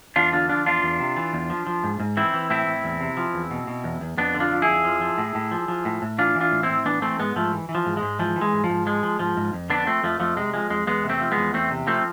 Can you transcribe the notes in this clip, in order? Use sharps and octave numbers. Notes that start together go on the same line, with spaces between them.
E2 D4 F4
D3 D4 F4
F3 D4 F4
E2 D4 F4
E2
C3
E3
E2
F3
F3
G#2
G#2
E3 C4 E4
E3
A2 C4 E4
A2
E2
C3
F3
E2
B2
B2
E2
E2
F2 B3 D4
D3
D4 F4
F3
E4 G#4
F2
F3
F3
A2
A2
F3
F3
A2
A2
E3 D4 F4
E3
D4 F4
A2
C4 E4
A2
E3 B3 D4
E3 A3 C4
G#2 G#3 B3
G#2 F3 A3
E3
E3
F3
G#2
G#3
G#2
E3 F3
E3
G#3
G#2
F3
G#2
F3 G#3
F3
G#2 F3
G#2
F2
D3 B3 D4
F3 A3 C4
F2 F3 A3
F2 F3 A3
C3 G#3
F3 G#3
F2 G#3
E2 G#3 B3
C3
A3 C4
F3
G#3 B3
E2
E2 A3 C4
C3
F3 A3 C4